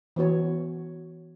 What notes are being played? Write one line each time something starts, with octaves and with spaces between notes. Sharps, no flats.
E3 B3 F#4 C#5